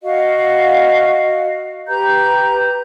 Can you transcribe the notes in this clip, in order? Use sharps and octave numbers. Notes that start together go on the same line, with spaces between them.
F#4 D#5 F5
G4 B4 A#5 G6